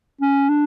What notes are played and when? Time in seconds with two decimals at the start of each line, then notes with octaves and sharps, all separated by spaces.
0.21 C#4
0.49 D4